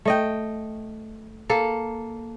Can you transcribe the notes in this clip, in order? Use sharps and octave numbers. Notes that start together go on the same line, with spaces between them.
A3 D#5 G5
A#3 A4